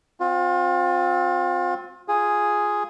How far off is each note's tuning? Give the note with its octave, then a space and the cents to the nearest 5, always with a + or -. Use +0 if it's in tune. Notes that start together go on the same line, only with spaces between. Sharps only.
C4 +0 F4 +35
F4 +0 G#4 +0